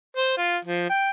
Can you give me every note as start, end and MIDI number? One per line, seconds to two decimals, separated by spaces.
0.17 0.37 72
0.38 0.57 65
0.65 0.89 53
0.89 1.11 79